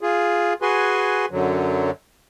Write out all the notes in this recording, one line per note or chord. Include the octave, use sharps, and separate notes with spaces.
F4 G#4
F#4 G#4 B4 G#5 C6
F#2 D3 F#3